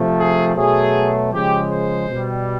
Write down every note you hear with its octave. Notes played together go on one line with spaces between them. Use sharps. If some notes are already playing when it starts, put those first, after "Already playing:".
Already playing: C3 F3 A3
G#4
B2 F#3 A3 G#4
C#3 F3 G#3 G4
C5
B2 G3